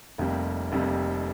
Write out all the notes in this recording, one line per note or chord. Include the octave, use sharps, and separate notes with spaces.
F1 F2 C3 G3 A#3
F1 F2 C3 G3 A#3